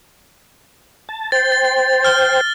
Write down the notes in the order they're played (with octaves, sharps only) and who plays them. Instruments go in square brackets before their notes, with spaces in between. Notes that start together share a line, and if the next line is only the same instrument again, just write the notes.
[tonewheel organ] A5
[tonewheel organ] C5 G5 [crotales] A6
[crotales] A6
F6 G7